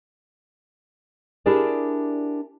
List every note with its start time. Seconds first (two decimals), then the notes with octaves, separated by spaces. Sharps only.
1.46 D4 E4 G4 G#4 A#4 D5